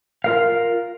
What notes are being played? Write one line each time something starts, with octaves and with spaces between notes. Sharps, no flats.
F4 A#4 F5